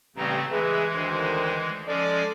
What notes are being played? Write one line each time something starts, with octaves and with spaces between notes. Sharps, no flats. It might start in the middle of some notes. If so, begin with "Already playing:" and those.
A1 C#3 G3 A3 C4 A#5
E3 G#3 G#4 B4 E5
D2 D#3 C5
F3 G#3 C#4 A4 D5